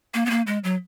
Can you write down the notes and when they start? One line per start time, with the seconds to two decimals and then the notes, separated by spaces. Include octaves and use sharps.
0.14 A#3
0.26 B3
0.30 A#3
0.47 G#3
0.64 F#3